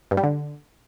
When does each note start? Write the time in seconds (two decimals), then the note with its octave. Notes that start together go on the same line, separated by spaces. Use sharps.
0.11 G2
0.17 G3
0.23 D3